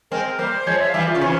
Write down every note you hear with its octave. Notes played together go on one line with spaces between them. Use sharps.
G#3 C4 A#4
G3 A#3 C5
F3 G#3 C#5
E5
F5
E3 G3 E5
F4
C#3
C3 E3 C#4